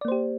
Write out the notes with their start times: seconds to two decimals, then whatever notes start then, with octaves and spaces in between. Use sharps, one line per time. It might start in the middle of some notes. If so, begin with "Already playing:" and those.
0.01 D5
0.05 A#3
0.08 C5
0.12 G4